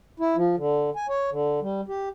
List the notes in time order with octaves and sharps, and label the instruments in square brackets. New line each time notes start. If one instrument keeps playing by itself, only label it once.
[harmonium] E4
F3
D3
G#5
C#5
D3
G3
G4